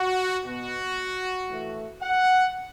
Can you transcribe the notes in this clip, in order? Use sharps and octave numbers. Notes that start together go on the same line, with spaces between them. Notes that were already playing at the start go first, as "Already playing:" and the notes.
Already playing: F#4
B2 B3 F#4
A2 E3 A3
F#5